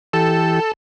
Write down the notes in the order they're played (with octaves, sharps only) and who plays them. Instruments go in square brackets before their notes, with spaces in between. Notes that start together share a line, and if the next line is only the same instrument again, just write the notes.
[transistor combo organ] E3 G4 [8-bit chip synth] A4 A5